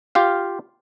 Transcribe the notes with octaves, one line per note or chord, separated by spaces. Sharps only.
F4 G4 F5